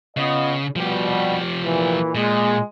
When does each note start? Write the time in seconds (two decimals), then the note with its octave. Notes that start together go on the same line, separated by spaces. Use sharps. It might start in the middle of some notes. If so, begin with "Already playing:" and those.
0.17 C#3 B3 F4 D#5
0.76 B2 F3 G3 G4
1.64 A#2 E3
2.15 A#2 G#3